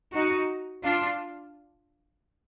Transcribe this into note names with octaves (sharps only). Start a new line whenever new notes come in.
D#4 F#4
D4 F4